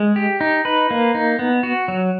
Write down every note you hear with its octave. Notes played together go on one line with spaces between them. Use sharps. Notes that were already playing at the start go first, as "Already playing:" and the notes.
Already playing: G#3
G4
D#4
B4
A#3
D#4
B3
F#4
F#3